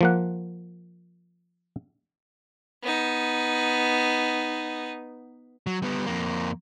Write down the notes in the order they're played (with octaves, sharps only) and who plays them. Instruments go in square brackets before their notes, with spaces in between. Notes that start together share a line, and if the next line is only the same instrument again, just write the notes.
[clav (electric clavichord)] F3 A#3 F#5
[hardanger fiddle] B3 D#4
[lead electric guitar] F#3
G3 B3
F2 A#3